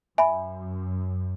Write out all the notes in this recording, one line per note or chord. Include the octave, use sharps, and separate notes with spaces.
F#2 E5 G#5 B5